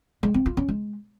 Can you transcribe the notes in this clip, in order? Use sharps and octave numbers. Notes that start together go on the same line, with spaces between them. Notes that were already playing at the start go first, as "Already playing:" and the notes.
G#3
C4
F4
C#4
G#3